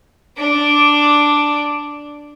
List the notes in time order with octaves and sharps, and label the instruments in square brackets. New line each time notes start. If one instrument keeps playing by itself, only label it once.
[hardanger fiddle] D4 D5